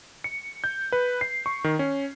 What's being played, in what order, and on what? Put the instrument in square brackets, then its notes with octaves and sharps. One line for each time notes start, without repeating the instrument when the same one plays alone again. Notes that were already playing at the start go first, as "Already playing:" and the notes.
[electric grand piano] C#7
G6
B4
C7
C#6
D#3
C#4